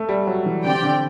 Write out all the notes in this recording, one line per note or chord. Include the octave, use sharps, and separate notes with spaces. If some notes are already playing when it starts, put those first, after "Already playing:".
Already playing: A3
G3
F#3
E3
D3 C4 G4 D5 G5
D3